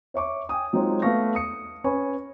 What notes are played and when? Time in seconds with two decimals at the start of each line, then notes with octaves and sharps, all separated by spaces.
0.14 C#5 E5 C#6 D6
0.49 G5 G#5 D#6
0.73 F#3 G#3 C4 D#4 F4 C#5
1.02 A3 B3 F5 C#6 A#6
1.35 D#6 C#7
1.84 C#4 B4 C#5 G#5 B5 C#6